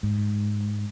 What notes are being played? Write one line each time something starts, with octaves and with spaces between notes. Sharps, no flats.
G#2